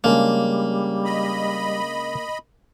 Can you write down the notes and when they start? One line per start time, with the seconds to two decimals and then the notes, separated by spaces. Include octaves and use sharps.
0.04 C#3 G3 G#3 A#3 D4
1.05 D#5 B5